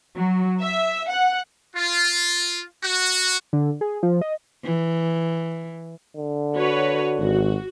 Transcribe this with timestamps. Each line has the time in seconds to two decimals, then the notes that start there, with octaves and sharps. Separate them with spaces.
0.15 F#3
0.60 E5
1.08 F#5
1.75 F4
2.83 F#4
3.53 D3
3.81 G#4
4.03 F3
4.21 D#5
4.64 E3
6.16 D3
6.55 F#4 B4 C#5
7.20 G#1 F#4